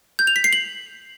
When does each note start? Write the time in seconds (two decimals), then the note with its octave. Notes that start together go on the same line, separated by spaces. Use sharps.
0.19 G6
0.27 F7
0.36 B6
0.44 C7
0.53 F#7